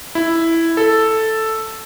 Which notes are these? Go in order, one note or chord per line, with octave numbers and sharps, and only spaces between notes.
E4
A4